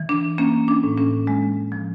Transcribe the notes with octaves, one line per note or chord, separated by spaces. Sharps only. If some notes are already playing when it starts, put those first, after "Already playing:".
Already playing: E3
D4
A#3 C#4
D4
A2
C#4
G#3
F3